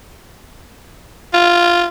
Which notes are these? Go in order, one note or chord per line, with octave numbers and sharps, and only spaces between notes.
F4